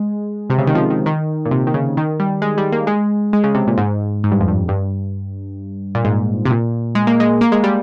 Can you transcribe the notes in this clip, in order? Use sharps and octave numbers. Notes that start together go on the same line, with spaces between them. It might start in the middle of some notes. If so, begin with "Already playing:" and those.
Already playing: G#3
C3
C#3
D#3
F3
D#3
D#3
A#2
C3
D#3
C#3
D#3
G3
G#3
G3
A#3
G#3
G#3
C#3
C3
A#2
G#2
G#2
G2
F2
G2
G2
A#2
G#2
C3
A#2
G#3
A#3
G#3
A#3
G#3
G3